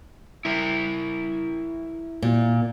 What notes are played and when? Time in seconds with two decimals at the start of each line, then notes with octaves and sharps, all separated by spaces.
0.45 E4 A#4
2.23 A#2